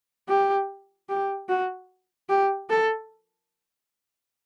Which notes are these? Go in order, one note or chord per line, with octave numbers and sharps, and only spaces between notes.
G4
G4
F#4
G4
A4